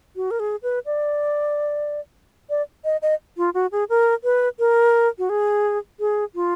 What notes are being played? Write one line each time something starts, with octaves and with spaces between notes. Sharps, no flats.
F#4
A#4
G#4
B4
D5
D5
D#5
D#5
F4
F#4
G#4
A#4
B4
A#4
F#4
G#4
G#4
F4